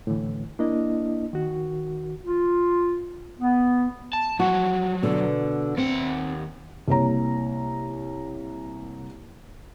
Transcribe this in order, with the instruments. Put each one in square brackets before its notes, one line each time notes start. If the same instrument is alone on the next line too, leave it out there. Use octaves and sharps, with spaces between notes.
[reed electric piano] A2 D3 E3
A#3 D4 E4 D#5
D#3 F#4
[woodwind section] F4
B3
[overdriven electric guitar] A5
[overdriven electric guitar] F3 F#3 [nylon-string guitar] F#4
[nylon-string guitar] B2 D3
[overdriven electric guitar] D#2 F#5 [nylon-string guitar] C4
[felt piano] C2 A#3 C#5 A#5